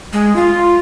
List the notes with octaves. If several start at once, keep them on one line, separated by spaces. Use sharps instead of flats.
G#3
F4